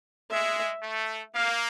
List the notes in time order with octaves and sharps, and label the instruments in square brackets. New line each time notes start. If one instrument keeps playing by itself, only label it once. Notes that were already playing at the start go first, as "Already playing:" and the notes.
[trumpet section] G#3 [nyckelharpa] E5
[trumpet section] A3
[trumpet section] A#3 [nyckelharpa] F5